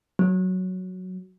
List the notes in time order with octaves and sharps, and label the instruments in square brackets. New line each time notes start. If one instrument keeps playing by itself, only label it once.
[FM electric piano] F#3